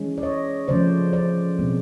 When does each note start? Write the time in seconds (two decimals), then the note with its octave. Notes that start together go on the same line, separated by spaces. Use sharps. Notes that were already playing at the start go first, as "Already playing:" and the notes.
Already playing: E3 G#3 C#4
0.18 D5
0.23 C#5 D#5
0.68 C#3 F3 A3 C5 D5
1.13 C5 D5
1.59 B2 G#3 C4